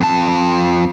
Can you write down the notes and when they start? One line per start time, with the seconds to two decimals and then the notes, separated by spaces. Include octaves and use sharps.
0.01 F2 A5